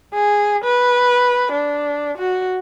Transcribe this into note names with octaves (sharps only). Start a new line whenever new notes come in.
G#4
B4
D4
F#4